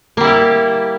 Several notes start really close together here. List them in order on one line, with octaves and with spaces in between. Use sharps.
A#3 G3 E4 G4